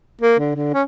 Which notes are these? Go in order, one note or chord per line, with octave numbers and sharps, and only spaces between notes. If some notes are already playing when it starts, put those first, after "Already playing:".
A#3
D3
D3
C#4